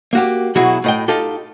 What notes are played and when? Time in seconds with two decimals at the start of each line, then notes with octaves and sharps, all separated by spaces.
0.13 A#3 F#4 G4
0.55 B2 F#3 E4 F#4 G#4
0.84 A2 D#5 G5
1.08 D#4 F4 G4 A4